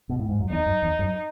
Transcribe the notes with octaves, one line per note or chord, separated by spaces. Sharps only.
B2
A2
G#2
F#2
E2 D#4
F#2
E2
F#2